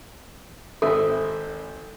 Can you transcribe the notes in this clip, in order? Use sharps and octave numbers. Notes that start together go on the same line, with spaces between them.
G#1 C4 A4 E5